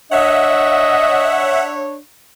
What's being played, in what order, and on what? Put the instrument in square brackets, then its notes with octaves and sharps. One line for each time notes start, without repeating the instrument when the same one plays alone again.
[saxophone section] D4 C#5 [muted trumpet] D#5 [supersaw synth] E5 F#5